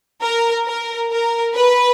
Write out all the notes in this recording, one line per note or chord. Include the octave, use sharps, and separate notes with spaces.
A#4
A#4
A#4
B4